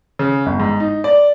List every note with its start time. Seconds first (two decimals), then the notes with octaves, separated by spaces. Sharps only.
0.19 C#3
0.46 G1
0.60 G#2
0.80 D#4
1.04 D5